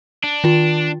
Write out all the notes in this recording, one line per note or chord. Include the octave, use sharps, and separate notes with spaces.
D4
D#3 F4